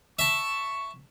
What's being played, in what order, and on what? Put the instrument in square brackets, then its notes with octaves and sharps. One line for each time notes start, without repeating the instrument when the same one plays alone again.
[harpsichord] E5 A5 [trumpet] C#6